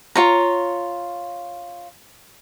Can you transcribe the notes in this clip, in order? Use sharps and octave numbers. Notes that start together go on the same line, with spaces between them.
F4 C#5 A#5